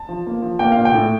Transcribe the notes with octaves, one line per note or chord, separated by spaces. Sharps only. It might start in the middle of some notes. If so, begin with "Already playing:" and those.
Already playing: A5
F3
A#3
F3
A#3 G5
F5
A#2
G5
A2